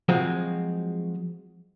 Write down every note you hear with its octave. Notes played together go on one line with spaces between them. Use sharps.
F3 F#3 G#3 C4 F4 A#5